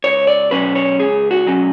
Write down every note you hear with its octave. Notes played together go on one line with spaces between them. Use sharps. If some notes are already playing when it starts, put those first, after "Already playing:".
C#2 C#5
D5
B2 F#3 C#4 B4
C#5
C#2 G#4
F#4
B2 F#3 C#4